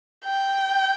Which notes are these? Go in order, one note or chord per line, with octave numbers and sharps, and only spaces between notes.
G5